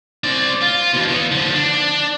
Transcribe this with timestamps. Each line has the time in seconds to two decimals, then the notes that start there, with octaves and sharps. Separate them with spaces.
0.24 C4 D5
0.62 F4
0.93 B2 E3
1.07 E3 B3
1.31 D3 F3
1.54 D4